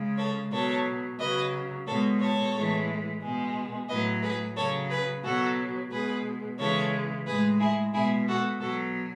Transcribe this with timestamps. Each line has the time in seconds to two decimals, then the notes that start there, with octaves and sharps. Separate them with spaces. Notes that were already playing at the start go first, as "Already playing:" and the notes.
Already playing: C#3 G#3
0.18 A4 C#5
0.52 B2 F#3 A4 C#5
1.19 C#3 F#3 B4 D#5
1.87 B2 G#3 A4 C#5
2.20 A4 C#5
2.54 A2 E3 G#3
3.22 B2 G#3
3.89 A2 F#3 B4 D#5
4.22 G#4 B4
4.56 C#3 F#3 A4 C#5
4.90 G#4 B4
5.23 B2 F#3 F#4 A4
5.91 B2 G#3 G#4 B4
6.59 C#3 E3 G#3 A4 C#5
7.26 A2 G#3 G#4 B4
7.60 E4 G#4
7.93 B2 G#3 E4 G#4
8.28 F#4 A4
8.61 B2 F#3 F#4 A4